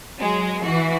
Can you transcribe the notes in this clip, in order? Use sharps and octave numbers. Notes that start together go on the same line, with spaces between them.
F#3 G#3
E3 F#4